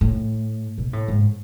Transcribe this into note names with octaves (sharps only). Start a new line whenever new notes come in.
A2
B2
A2
G#2